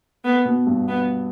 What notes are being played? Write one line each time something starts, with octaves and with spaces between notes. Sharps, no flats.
B3
B2 B3
G2 G3
B3